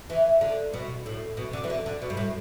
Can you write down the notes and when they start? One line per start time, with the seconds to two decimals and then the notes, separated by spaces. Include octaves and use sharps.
0.10 E3
0.41 D3
0.73 B2
1.06 A2
1.37 B2
1.53 D3
1.64 E3
1.70 D3
1.86 D3
2.02 B2
2.10 G2
2.17 A2